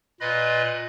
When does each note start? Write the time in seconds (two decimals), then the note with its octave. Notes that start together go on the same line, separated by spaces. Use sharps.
0.21 A#2 F4 B4 D#5 B5